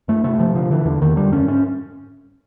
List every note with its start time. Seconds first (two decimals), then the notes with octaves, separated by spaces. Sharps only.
0.08 G2 A3
0.24 C3 A3
0.39 C3 F3
0.54 D3 F3
0.70 D3 E3
0.85 E2 D3
1.01 E2 D#3
1.16 D3 G3
1.32 F#2 C#4
1.47 G#2 C#4